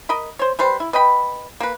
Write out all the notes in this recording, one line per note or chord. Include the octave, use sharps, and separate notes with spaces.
A#4 D#5 B5
C5 C#5
G3 B4 C5
E4
B4 D#5 G5 B5
A#3 B4